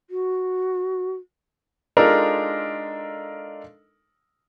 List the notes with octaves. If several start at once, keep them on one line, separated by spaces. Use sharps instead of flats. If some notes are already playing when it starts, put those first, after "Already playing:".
F#4
G#3 D4 D#4 F4 A4 A#4